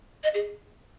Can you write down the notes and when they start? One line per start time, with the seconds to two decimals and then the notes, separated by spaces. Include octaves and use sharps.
0.24 D#5
0.34 G#4